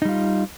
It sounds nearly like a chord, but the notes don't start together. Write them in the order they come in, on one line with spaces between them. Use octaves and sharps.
D#4 G3 F4